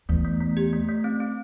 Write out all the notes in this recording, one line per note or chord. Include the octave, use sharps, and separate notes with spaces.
E2 A3
A3
A3
G4
A3
A3
C4
C4